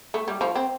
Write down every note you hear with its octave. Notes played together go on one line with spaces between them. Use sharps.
A3
G3
F3
C4